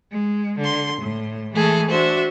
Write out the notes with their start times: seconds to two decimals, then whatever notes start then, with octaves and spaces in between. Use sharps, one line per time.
0.11 G#3
0.59 D3 C6
1.01 A2
1.52 E3 G#3 A3 G#4 A4
1.90 D4 F#4 C5 E5